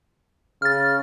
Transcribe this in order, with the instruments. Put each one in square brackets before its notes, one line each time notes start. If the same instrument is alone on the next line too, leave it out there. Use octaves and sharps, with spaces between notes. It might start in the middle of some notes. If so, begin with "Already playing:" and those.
[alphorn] C#3 [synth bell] F6 A6